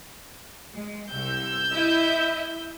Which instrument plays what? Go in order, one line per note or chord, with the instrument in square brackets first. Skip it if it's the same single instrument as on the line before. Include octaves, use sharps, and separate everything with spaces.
[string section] G#3
[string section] C2 [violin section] E6 G6
[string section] E4 D#5 E5